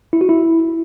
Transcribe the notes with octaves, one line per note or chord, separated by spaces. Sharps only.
E4
F#4
E4